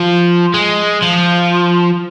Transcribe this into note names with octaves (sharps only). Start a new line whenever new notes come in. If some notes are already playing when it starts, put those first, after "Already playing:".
Already playing: F3
G#3
F3